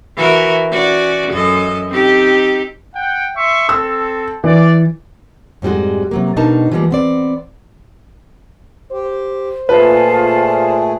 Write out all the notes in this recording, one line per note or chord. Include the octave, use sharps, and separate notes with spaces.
E3 F#4 A#4
C#4 F#4 D5
F#2 A4 D#5
C4 D#4 G4
F#5 G5
E5 C6 C#6
C4 A4 E6
E3 D5
F2 G#2 G3 G#3 F#4
C3 F#3 A#3
B2 D4 D#4 A#4 A5
E3 F3 G3 G#3 A#3
B3 C4 D5
G4 C5
A#2 A3 F4 G#4 B4 A5